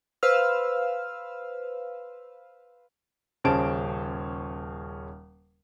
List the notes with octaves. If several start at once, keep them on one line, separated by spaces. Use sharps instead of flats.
B4 C5 F5 E6 F6
D#1 C#3 C#4 C5 A5 D7